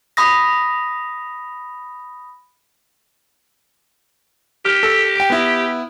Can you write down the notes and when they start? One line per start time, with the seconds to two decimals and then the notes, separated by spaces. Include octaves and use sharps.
0.17 B5 D#6 A#6
4.65 G4 F6
4.83 A4
5.16 G5 D7
5.30 B3 E4